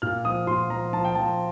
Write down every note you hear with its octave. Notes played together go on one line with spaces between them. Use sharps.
A#2 F6
F3 D#6
A#2 C6
F3 A#5
F3 A5
G5
F3 A5